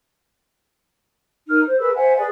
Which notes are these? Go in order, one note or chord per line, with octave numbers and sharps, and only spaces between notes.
D#4 A#4 F6
C5
G#4 A#4 B4 E6
C5 E5 F#5 G#5
G#4 B4 D5 G#5